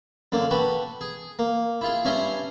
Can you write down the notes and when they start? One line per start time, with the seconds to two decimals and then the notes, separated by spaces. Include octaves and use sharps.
0.32 F#2 D3 A#3
0.51 F#4 G4 A4 B4
1.01 G#4
1.39 A#3
1.81 E4 F4 G#4
2.05 G2 C#4 E5 G#5 A#5 C6